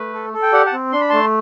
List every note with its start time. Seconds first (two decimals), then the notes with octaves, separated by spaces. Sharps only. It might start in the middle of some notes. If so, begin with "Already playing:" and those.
Already playing: A3 B4
0.13 A4
0.33 A4
0.42 G5
0.53 G4 D5 F#5
0.66 F#5 A5
0.73 C4
0.92 D4 C6
1.01 B5
1.09 A3 A5 C6